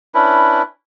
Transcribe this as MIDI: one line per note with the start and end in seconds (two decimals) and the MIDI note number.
0.14 0.62 61
0.14 0.62 62
0.14 0.62 64
0.14 0.62 71